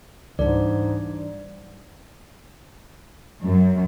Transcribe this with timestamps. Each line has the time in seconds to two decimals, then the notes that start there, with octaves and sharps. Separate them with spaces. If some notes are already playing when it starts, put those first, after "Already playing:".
0.39 C#2 G#2 E3 G3 D4 D5
3.45 F#2